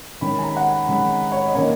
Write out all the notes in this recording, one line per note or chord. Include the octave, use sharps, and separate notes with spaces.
D#3 G#3 C#4 B5
G#5
A#5
F#5
G#5
D#3 G#3 C#4 B5
C#5
D#5
D#3 A#3 C#4 C#5